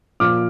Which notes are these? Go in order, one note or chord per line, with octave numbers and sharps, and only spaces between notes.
A#2 F3 D6 F6